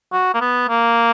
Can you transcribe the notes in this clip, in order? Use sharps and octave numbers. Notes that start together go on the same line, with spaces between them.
F#4
A#3
B3
A#3